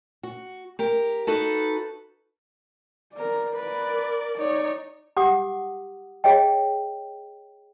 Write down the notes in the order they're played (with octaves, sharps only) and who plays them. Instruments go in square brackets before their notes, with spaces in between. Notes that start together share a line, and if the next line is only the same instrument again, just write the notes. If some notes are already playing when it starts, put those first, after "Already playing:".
[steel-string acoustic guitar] F#4
G4 A#4
D#4 F#4 A4 B4 D#5
[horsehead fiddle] A#4 D5
[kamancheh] A#4 D5 [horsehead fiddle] B4
[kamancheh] D#4 C#5 [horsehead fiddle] D5
[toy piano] G4 F#5 D6 D#6
G#4 C#5 D#5 G5